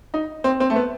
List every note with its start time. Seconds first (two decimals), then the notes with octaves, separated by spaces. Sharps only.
0.14 D#4
0.44 C4
0.60 C4
0.70 A3
0.76 B3